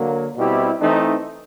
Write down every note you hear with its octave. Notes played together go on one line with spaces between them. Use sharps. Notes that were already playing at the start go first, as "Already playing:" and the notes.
Already playing: D3 F#3 A#3
B2 G3 C4 E4 G4
E3 A3 C4 D#4